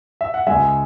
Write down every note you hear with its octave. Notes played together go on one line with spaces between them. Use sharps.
E5
F#5
C#2 C#3 G#3 E5 G#5